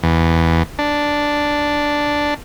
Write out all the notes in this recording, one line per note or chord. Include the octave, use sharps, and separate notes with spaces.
E2
D4